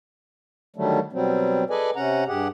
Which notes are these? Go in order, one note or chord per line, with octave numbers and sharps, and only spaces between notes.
D3 D#3 F#3 G3 A3
B2 F#3 G3 C4
G#4 A4 B4 D5 D#5 G#5
C3 C#4 F#5 A#5
G2 G4 G#4 F#5